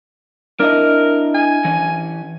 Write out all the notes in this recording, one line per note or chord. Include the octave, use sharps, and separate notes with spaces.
D4 E4 A#4 D#5
G#5
E3 C#4